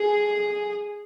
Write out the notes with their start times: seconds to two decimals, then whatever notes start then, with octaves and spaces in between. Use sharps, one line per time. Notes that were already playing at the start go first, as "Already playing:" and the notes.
Already playing: G#4